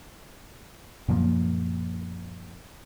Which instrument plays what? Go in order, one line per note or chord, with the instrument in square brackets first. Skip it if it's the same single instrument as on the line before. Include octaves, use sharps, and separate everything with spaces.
[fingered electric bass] F#2 A#2 F3 A#3